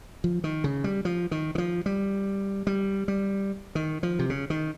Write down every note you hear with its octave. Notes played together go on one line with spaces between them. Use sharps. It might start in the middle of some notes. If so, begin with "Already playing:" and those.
F3
D#3
C#3
G3
F3
D#3
D#3
F3
G3
G3
G3
D#3
F3
C3
C#3
D#3